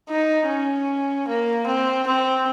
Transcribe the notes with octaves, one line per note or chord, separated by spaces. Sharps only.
D#4
C#4
A#3
C4
C4